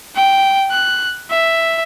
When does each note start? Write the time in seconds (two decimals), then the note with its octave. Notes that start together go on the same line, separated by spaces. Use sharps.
0.15 G5
0.71 F#6
1.30 E5